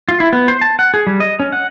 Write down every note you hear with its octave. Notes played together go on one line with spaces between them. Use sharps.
F4
E4
B3
C5
A5
F#5
G#4
G3
D#5
C#4
F#5